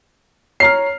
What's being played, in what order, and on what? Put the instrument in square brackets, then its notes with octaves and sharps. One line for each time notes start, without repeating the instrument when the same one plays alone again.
[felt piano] C#5 A#5 F6 [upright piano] C7